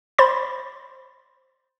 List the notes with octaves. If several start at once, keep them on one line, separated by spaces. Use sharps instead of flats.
C5 B5 C6 A6